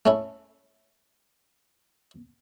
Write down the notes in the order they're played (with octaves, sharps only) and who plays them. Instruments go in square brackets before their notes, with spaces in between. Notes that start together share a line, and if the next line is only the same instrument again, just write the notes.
[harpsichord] A3 C#4 E4